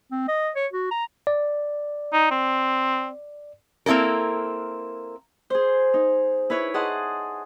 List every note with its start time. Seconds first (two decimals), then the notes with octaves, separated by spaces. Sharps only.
0.12 C4
0.28 D#5
0.56 C#5
0.73 F#4
0.91 A#5
1.27 D5
2.13 D#4
2.31 C4
3.86 A#3 C4 E4 A4 A#4
5.50 G#4 C5
5.94 D#4
6.50 E4 B4 C#5
6.74 G#4 D#5 F#5 A5 C6 D#6